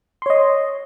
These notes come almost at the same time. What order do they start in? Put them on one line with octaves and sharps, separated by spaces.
C6 C#5 D#5